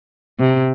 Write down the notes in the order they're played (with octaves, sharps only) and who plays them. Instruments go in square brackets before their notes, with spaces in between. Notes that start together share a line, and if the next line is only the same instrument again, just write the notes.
[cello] C3